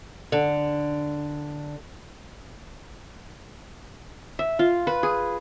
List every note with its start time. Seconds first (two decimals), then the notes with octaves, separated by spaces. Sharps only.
0.32 D3
4.39 E5
4.59 F4
4.87 B4
5.03 G#4